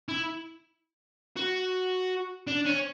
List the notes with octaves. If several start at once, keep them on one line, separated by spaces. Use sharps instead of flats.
E4
F#4
D4
C#4